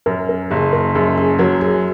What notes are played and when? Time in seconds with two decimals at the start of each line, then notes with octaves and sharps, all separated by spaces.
0.06 F#2 A#4
0.29 A#4
0.50 F#1 G#4
0.73 A#4
0.95 F#2 G#4
1.18 G#4
1.39 F#3 A#4
1.61 G#4